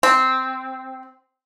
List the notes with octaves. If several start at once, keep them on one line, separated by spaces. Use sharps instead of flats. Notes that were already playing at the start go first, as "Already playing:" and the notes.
C4